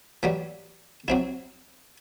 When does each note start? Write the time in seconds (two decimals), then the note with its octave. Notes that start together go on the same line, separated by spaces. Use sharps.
0.23 E3 F#3 G3
1.08 F#3 C4 E4